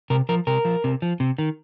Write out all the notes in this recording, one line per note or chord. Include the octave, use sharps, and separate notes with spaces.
C3 A#4
F3 A#4
C3 A#4
F3
C3
F3
C3
D#3